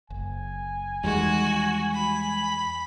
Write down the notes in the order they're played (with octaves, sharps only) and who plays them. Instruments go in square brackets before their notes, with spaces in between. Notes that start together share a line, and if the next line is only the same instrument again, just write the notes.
[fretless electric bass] F#1 [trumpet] G#5
[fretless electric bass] E2 D#3 [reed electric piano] G3 G#3 [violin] F#4
[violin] B5